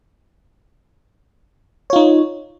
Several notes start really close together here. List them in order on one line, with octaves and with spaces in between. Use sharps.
C#5 F4 D#4